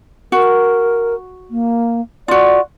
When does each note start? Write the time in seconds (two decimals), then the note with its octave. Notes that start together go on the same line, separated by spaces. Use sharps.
0.32 F#4 A#4
1.50 A#3
2.28 F4 F#4 D5